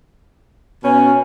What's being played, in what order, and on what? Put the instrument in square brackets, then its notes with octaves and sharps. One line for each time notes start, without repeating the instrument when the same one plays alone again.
[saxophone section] B2 C#4 [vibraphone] G#5